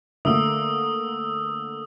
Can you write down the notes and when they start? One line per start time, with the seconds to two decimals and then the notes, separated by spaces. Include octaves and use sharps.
0.25 D3 A3 A#3 D#6 E6